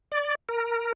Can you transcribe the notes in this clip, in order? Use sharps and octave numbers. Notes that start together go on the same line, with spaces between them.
D5
A#4